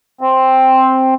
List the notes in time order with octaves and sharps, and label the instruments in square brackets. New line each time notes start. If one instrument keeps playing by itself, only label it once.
[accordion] C4